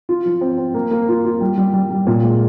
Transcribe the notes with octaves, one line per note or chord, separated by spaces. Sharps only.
F4
F3
C4
C4
A#3
A#3
F4
F4
G3
G3
G3
G3
A#2
G#3